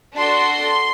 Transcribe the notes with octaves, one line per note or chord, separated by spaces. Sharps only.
D4 F#4 A4 C6